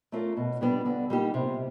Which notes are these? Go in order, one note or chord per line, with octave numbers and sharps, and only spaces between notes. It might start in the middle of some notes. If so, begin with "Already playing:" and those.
A3 C#4 F4 A#4
B2
G3 B3 D4 G4
D3
G3 A#3 D#4 G4
C3